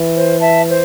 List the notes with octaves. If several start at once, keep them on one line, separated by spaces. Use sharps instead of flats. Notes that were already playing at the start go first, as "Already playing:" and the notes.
Already playing: E3
C5
E5 A5
C5